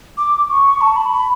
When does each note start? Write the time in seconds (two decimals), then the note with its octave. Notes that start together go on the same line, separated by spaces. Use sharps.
0.17 D6
0.50 C#6
0.81 A5
0.96 B5
1.13 B5